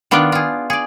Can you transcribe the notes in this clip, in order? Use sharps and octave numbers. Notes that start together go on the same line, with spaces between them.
D#3 B3 D4 F4 D5
F4 G#4
G#4 D5